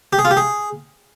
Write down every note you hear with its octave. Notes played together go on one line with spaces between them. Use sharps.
G4
G#4
F4
G4
G#4